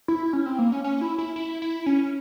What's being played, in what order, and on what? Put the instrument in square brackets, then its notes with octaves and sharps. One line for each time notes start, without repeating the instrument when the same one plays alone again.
[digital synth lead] E4
C#4
C4
A#3
C#4
C#4
E4
E4
E4
E4
C#4